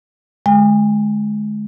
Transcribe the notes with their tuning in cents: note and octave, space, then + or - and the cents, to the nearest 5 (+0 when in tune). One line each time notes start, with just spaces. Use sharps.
D3 +5 G#3 +15 G#5 -45